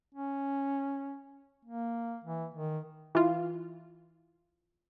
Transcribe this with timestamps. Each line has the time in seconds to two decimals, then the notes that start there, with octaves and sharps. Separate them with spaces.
0.15 C#4
1.65 A#3
2.25 E3
2.54 D#3
3.15 E3 F4